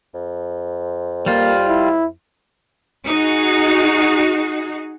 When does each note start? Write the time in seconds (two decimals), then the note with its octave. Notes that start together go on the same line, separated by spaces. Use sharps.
0.14 F2
1.26 G3 A#3 F4
1.68 E4
3.07 D#4 F#4 G#4